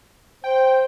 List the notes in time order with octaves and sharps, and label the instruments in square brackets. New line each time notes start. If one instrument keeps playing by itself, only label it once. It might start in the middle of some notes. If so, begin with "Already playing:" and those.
[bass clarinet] C5 [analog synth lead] G5